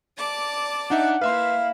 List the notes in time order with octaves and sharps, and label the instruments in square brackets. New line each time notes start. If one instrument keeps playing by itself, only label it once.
[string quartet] D5 A5 D6
[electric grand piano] D4 D#4 E5 [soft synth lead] F#5
[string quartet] A#3 E4 [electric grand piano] B4 E5 C6 [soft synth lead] F5